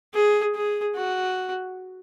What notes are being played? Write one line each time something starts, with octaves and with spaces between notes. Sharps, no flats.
G#4
G#4
F#4